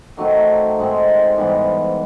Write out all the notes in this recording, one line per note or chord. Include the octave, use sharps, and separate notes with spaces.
D#3 F#3 A3 C4
G#2 D#3 G#3 C4
G#2 E3 G3 B3